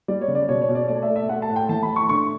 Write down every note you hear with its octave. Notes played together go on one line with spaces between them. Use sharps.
G3 D5
C#5
C#3
D5
B2 C#5
C#5
B2
D5
A3 D5
E5
A3
E5
A3 F#5
A5
A2
G5
E3 A5
B5
A2
C#6
D3 C#6